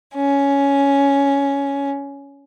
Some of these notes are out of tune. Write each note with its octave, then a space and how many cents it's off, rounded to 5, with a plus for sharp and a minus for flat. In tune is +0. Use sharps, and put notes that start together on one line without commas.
C#4 +10